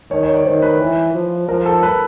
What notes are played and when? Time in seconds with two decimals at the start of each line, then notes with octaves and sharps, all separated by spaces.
0.11 D#3 C#5
0.23 C#5
0.34 D5
0.45 D#3 C5
0.62 B4
0.80 E3
1.14 F3
1.49 F3 A#4
1.66 A4
1.83 B4